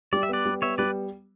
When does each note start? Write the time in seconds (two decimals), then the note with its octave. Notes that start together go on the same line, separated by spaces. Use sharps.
0.13 G3 D5
0.23 E5
0.29 B3 B4 D5
0.45 G3
0.62 B3 C#5 E5
0.78 G3 B4 D5